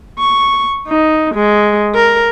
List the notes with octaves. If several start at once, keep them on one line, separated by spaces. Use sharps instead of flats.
C#6
D#4
G#3
A#4